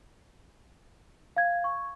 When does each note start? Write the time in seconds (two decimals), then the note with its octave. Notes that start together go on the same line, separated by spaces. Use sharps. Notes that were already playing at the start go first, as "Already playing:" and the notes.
1.37 F5 G#6
1.64 C#6